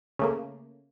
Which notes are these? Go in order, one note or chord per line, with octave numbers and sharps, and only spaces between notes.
C#3 A3 A#3